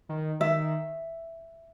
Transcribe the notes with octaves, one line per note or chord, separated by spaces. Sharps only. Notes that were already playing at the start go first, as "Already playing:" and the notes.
D#3
D#3 E5